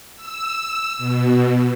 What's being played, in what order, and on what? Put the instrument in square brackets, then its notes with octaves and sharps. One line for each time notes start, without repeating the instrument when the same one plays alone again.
[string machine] E6
B2